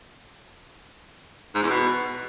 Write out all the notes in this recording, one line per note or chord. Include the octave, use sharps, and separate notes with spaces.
G#2
E2
B2